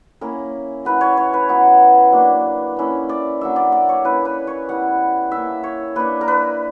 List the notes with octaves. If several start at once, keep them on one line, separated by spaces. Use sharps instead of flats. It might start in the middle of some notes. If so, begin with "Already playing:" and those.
A#3 C#4 E4 A#4
F#3 C#4 E4 B4
C#5
C#5
B4
F#3 B3 E4
F#3 A#3 D4
A#3 C#4 E4
D5
F#3 A#3 D4 E5
D5
D5
C#5
A#3 C#4 E4 B4
B4
C#5
G3 B3 E4 F#5
A#3 C#4 E4 E5
C#5
A#3 D4 B4
A#4
B4